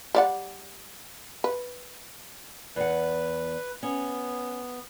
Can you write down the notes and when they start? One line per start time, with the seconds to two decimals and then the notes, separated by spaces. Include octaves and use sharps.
0.15 G3 D5 F#5
1.44 B4
2.76 E2 B4 F#5
3.83 B3 C#4